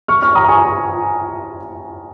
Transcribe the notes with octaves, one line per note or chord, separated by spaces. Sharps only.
C#6 F6
C#6 F6
A#5 D#6
G#5 C#6